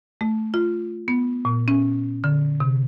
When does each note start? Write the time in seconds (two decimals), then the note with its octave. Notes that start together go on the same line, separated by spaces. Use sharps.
0.21 A3
0.54 F4
1.08 B3
1.45 A#2
1.68 C#4
2.24 D3
2.60 C3